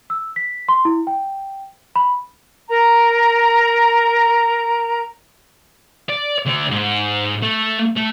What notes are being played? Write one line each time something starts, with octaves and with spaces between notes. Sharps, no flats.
E6
B6
C6
E4
G5
B5
A#4 A#5
D5
D2 D5
G#2
A3
A3